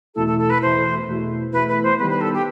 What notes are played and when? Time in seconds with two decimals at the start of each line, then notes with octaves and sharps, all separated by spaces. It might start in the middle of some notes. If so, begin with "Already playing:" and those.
0.15 E2 B2 A3 E4 A4
0.27 A4
0.38 A4
0.49 B4
0.61 E2 B2 A3 E4 C5
1.07 E2 B2 A3 E4
1.52 E2 B2 A3 E4 B4
1.68 B4
1.83 C5
1.98 D#3 G3 B3 B4
2.10 B4
2.21 A4
2.33 G4